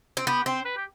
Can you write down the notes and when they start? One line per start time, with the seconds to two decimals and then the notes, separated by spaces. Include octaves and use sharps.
0.17 C4
0.27 B3 G4
0.46 C4 C5
0.65 B4
0.77 G4